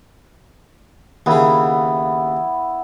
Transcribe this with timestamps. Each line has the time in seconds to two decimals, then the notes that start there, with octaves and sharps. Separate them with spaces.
1.26 D#2 C#3 B3 E4 B5